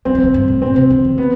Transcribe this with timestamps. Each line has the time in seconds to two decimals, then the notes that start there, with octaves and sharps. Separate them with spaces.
0.05 F#3 C4
0.15 E3
0.24 D3
0.34 G2
0.48 A2
0.62 B2 C4
0.76 C3
0.90 D3
1.05 E3
1.18 B3